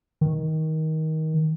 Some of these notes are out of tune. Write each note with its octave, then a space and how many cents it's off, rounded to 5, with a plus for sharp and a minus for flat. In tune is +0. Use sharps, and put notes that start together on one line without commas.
D#3 +20